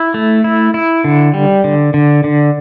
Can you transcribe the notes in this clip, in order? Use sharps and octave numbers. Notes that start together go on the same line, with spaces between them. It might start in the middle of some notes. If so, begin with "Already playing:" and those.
Already playing: E4
A3
E4
E4
D3
G3
D3
D3
D3